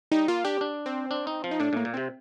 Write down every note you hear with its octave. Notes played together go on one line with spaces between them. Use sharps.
G3 D#4
A#3 F4
D4 G4
D4
C4
D4
D#4
F3
D#4
A2 D4
A2 A#3
A#2
C3 C4